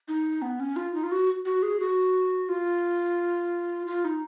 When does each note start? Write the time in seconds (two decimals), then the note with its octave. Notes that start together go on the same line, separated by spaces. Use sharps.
0.08 D#4
0.42 B3
0.60 C#4
0.76 F4
0.94 D#4
1.03 F4
1.12 F#4
1.45 F#4
1.62 G#4
1.80 F#4
2.49 F4
3.87 F4
4.04 D#4